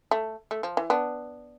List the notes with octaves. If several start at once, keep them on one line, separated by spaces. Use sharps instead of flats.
A3
A3
F3
E3
B3 D4